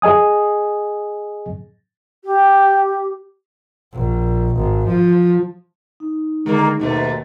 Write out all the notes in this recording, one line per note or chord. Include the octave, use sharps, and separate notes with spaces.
G#4 D#5 G#5 D#6
G4
A#1
G#1
F3
D#4
D3 D#3 G#3 A#3
D#2 G#2 B2 A3